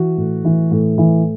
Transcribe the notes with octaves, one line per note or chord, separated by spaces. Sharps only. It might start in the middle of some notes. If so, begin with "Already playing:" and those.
Already playing: E3 F#4
A2
E3
A2
E3